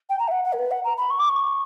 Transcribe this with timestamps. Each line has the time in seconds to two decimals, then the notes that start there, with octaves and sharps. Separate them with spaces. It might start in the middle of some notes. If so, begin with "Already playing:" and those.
0.09 G5
0.19 A#5
0.28 E5
0.31 F#5
0.44 F#5
0.53 A#4
0.58 B4
0.71 F#5
0.84 A#5
0.98 B5
1.10 C#6
1.19 D6
1.29 C#6